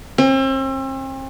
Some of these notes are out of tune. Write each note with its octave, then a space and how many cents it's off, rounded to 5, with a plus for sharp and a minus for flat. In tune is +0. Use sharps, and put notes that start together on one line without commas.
C4 +40